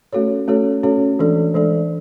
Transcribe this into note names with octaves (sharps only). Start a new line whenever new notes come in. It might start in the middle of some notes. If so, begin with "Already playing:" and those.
A3 C#4 F#4 A4 C#5
A3 C#4 F#4 A4 C#5
A3 C#4 F#4 A4 C#5
E3 G#3 D4 A4 D5
E3 G#3 D4 A4 D5